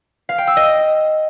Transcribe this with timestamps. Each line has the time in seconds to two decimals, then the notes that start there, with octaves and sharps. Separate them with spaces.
0.29 F5
0.38 G5
0.47 E6
0.57 D#5